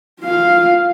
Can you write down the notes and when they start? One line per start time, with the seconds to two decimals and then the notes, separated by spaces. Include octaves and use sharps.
0.21 F4 F5